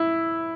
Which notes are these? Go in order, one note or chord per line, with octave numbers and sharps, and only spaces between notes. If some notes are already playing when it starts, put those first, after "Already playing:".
Already playing: E4